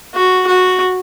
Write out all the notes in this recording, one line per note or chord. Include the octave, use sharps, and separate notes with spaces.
F#4
F#4